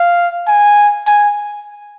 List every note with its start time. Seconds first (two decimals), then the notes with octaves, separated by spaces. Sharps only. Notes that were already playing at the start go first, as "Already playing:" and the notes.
Already playing: F5
0.48 G#5
1.07 G#5